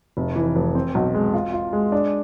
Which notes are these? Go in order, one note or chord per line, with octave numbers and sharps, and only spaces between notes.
F1
E3
F1
C4
B1
G#3
F4
F4
G#3
D4